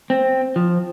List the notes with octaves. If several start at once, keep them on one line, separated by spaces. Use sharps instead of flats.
C4
F3